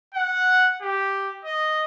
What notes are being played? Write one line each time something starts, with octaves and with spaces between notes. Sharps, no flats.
F#5
G4
D#5